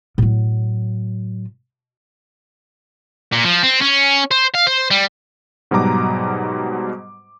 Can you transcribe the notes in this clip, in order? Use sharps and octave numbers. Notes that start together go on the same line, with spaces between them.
A2 F#3
A#2
F3
C4
C#4
C5
F5
C5
G3
G#2 B2 F#3 G3 A#5 D6